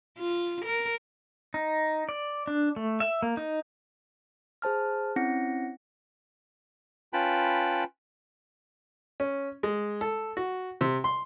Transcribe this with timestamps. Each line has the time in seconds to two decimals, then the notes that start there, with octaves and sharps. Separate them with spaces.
0.18 F4
0.65 A#4
1.54 D#4
2.09 D5
2.47 D4
2.76 A3
3.00 E5
3.22 A#3
3.37 D#4
4.62 G#4 C5 A5 F6
5.16 C4 C#4 E4 F#5 A#6 C#7
7.13 C#4 F4 B4 G5 A5 B5
9.20 C#4
9.63 G#3
10.01 A4
10.37 F#4
10.81 C3
11.04 C6